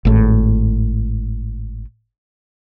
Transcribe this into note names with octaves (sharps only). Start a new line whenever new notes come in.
G#1 A2